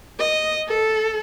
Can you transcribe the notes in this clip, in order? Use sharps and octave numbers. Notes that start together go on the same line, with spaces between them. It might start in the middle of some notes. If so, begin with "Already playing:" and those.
D#5
A4